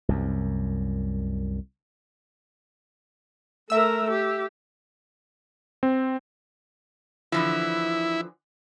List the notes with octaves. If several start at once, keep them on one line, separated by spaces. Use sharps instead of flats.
C2 F#2
A3 A#4 E5 E6
G4
C4
D3 E3 F3 E4